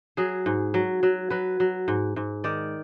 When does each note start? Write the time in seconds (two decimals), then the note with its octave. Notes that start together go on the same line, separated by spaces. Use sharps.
0.17 F#3 G#4
0.46 G#2
0.74 F#3
1.03 F#3
1.30 F#3 B4
1.60 F#3
1.88 G#2
2.16 G#2
2.44 D#3 D5